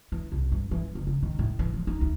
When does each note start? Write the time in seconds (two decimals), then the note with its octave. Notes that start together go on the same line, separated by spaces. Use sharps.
0.12 E3
0.32 C2
0.52 G2
0.71 E3
0.95 F#1
1.07 C#3
1.23 D#3
1.39 A2
1.59 E3
1.74 F3
1.87 D#4
2.01 D2